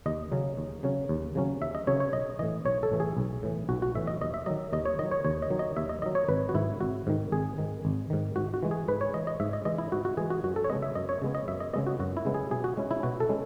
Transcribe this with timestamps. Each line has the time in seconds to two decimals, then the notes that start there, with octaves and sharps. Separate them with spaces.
0.06 D#2 D#5
0.32 C#3 F#3 C#4
0.57 D#2
0.83 C#3 F#3 C#4
1.09 D#2
1.35 C#3 F#3 C#4
1.61 D#2 E5
1.75 D#5
1.87 C#3 F#3 C#4 C#5
2.00 C#5
2.13 B1 D#5
2.39 A2 E3 D#5
2.65 B1 C#5
2.83 A4
2.91 A2 E3
3.00 G#4
3.17 B1
3.43 A2 E3
3.69 B1 F#4
3.82 F#4
3.95 A2 E3 E5
4.07 D#5
4.21 D#2 D#5
4.34 E5
4.46 D#3 F#3 D#5
4.73 D#2 D#5
4.85 C#5
4.99 D#3 D#5
5.03 F#3
5.11 C#5
5.25 D#2 C#5
5.42 D#5
5.50 D#3 F#3
5.59 D#5
5.77 D#2 E5
5.89 D#5
6.02 D#3 F#3 D#5
6.15 C#5
6.28 G#1 B4
6.49 F#4
6.54 G#2 D#3 E4
6.81 G#1 F#4
7.07 G#2 D#3
7.32 G#1 G#4
7.58 G#2 D#3
7.85 G#1
8.10 G#2 D#3
8.36 G#2 F#4
8.54 F#4
8.63 E3 G#3
8.71 G#4
8.88 G#2 B4
9.01 C#5
9.14 E3 G#3 D#5
9.27 D#5
9.40 G#2 E5
9.53 D#5
9.65 E3 G#3 D#5
9.78 E4
9.92 G#2 F#4
10.05 F#4
10.17 E3 G#3 G#4
10.30 F#4
10.44 F#2 F#4
10.56 A4
10.64 C#5
10.70 C#3 G#3 B3 D#5
10.83 E5
10.95 F#2 D#5
11.09 C#5
11.22 C#3 G#3 B3
11.35 D#5
11.48 F#2 E5
11.60 D#5
11.73 C#3 G#3 B3 D#5
11.87 F#4
11.99 F#2 F#4
12.17 E4
12.25 C#3 G#3 B3
12.34 G#4
12.51 B2 G#4
12.64 F#4
12.77 G#3 C#4 E4
12.91 E4
13.03 B2 F#4
13.20 A4
13.29 G#3 C#4 E4